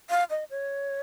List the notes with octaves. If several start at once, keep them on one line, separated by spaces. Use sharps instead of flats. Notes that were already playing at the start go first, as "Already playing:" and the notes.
F5
D#5
C#5